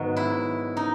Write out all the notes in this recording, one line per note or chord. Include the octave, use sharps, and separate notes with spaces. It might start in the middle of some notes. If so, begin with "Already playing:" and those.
Already playing: G#2 D#3 F#3 B3
E4
D#4